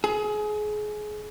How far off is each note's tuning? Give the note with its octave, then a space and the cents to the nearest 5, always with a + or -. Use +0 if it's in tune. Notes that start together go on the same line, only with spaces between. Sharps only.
G#4 +25